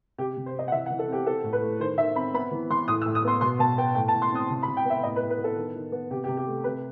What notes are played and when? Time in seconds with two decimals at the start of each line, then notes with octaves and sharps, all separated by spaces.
0.18 C3 G4
0.37 C3
0.46 C5
0.55 C4 D#5
0.68 F#5
0.72 E3 E5
0.86 F#5
0.90 E3
0.99 A4
1.08 C4 G4
1.26 C4 A4
1.44 A2
1.53 B4
1.62 A3
1.80 D#3 C5
1.98 D#3 E5
2.15 C4 B5
2.34 B3 B5
2.51 E3
2.70 E3 C6
2.88 A2 D#6
3.02 E6
3.06 A2
3.15 D#6
3.24 B3 C6
3.41 B2 C6
3.59 B2 A5
3.78 B3 G5
3.95 A2 G5
4.08 A5
4.13 A2
4.22 C6
4.31 C4 D#6
4.50 C3
4.63 B5
4.68 C3
4.77 G5
4.85 B3 E5
5.03 A2 D#5
5.16 B4
5.22 A2
5.30 B4
5.38 B3
5.44 A4
5.56 D#3
5.75 D#3
5.92 B3
6.11 C3 G4
6.24 G4
6.28 C3
6.37 G4
6.47 A3
6.64 C3 B4